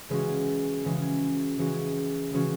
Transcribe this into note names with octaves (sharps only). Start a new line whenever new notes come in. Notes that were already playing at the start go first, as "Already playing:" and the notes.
C#3 E3 G#3 C#4 F#4
C#3 E3 G#3 C#4 F#4
C#3 E3 G#3 C#4 F#4
C#3 E3 G#3 C#4 F#4